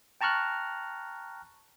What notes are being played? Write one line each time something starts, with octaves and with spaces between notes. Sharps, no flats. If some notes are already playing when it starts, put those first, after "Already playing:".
G5 A5 A#5 C#6 F6 F#6